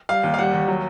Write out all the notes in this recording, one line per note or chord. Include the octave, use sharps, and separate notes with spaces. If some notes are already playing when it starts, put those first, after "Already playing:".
G3 F5
D#2
F5
G3 F#5
D#2
F#3